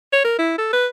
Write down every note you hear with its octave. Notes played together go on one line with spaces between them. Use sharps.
C#5
A#4
E4
A4
B4